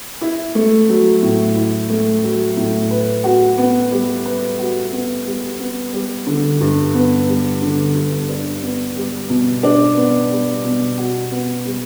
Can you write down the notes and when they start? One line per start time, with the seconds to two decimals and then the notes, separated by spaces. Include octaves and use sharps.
0.21 E4
0.55 A3
0.89 F#3
1.23 A2
1.56 E4
1.89 A3
2.24 F#3
2.57 A2
2.91 B4
3.24 F#4
3.58 B3
3.92 G3
4.25 B4
4.59 F#4
4.92 B3
5.26 G3
5.60 B3
5.93 G3
6.27 D3
6.61 G2
6.94 B3
7.28 G3
7.62 D3
7.95 G2
8.29 D4
8.63 B3
8.96 G3
9.30 B2
9.63 D4
9.97 B3
10.31 G3
10.64 B2
10.98 F#4
11.31 B3
11.65 G3